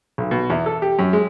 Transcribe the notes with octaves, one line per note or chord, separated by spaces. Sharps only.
B1
B2
E2
A4
G4
F#2
G#3